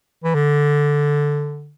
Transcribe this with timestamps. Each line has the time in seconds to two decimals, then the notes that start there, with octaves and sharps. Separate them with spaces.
0.24 E3
0.35 D3